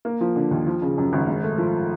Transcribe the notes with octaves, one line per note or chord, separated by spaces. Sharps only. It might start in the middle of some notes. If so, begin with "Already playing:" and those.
A#3
F3
D3
D#2
F3
C#3
F#2
G#1
G#2
A3
F3